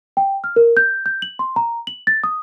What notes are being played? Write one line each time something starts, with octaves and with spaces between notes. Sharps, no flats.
G5
F6
A#4
G6
G6
F#7
C6
A#5
F#7
A6
D#6